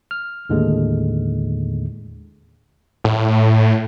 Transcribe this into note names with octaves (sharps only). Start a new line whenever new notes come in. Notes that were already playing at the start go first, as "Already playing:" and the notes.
F6
D#2 A2 D3 G#3
A2